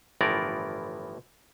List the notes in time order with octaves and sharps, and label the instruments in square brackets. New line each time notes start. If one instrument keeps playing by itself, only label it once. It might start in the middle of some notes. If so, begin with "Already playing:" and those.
[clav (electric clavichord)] G1 A2 E3 F3 A#4 D5